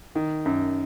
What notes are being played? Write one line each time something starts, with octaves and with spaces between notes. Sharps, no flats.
D#3
F#2